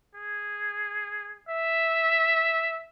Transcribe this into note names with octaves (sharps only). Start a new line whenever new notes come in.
G#4
E5